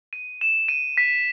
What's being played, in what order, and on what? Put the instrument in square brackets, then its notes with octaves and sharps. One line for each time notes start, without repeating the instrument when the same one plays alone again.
[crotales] D#7
E7
D#7
B6